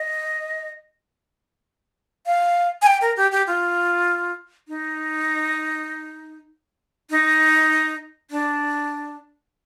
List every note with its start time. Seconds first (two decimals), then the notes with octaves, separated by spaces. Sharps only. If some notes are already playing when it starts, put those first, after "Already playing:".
Already playing: D#5
2.26 F5
2.82 G#5
2.87 G5
3.01 A#4
3.17 G4
3.32 G4
3.47 F4
4.68 D#4
7.10 D#4
8.31 D4